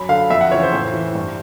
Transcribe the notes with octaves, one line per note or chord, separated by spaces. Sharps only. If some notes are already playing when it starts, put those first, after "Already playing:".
Already playing: F#2 B5
D3 F5
F2 E5
F#5
C#3 E3 C#5
C5
A2
E3
G2